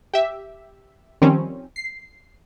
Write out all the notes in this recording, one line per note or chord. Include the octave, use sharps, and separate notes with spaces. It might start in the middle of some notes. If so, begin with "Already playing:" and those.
G4 E5
D#3 F3 G3 C4 C#4
C7